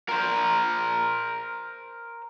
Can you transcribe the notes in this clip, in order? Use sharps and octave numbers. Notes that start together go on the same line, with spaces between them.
A#4 C5